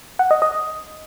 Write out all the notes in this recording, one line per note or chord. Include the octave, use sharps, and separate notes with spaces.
F#5
D#5
D#5